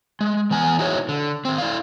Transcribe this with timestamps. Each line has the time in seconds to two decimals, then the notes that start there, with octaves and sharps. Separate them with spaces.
0.21 G#3
0.51 E3 B3 G#5
0.79 D#4 E4 F#4 G#4 A#4 C#5
1.09 D3
1.45 D#3 C4
1.58 E4 D5 F5